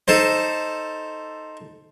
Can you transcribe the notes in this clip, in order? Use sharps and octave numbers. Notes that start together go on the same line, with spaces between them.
D#4 A4 C5